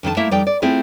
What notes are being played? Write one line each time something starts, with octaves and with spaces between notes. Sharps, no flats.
F2 D#3 F4 A5
A3 A#3 E4 E5
F2 G3 D#4 D5 G5
D5
A3 C4 E4 F4 G#4